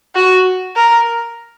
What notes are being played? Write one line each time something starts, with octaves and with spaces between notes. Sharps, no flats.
F#4
A#4